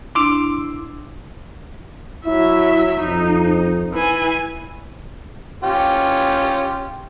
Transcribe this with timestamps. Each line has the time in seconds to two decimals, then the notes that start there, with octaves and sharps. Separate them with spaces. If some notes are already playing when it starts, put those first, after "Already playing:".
0.15 D4 E4 C6 D6 E6
2.26 F#3 E4 E5
3.00 F2 D#4
3.93 E3 G#5
5.63 C#4 F4 G4